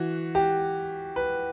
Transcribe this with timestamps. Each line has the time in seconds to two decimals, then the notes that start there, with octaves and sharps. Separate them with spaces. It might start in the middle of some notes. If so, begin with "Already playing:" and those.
Already playing: E3 F#4
0.35 G4
1.16 B4